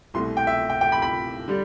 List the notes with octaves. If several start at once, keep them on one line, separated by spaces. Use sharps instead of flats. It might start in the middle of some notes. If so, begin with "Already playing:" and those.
C2 B2 A3 C6
G5
E5
G5
G5
B5
B5
D3 G3